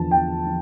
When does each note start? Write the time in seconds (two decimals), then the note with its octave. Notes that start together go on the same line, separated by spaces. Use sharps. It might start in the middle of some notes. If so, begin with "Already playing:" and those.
Already playing: E2 D3 F3 A5
0.11 E2 G5
0.47 F3